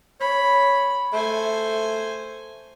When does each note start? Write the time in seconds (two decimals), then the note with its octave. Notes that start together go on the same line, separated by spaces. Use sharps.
0.20 C#5 B5
1.13 A3 C5 G#5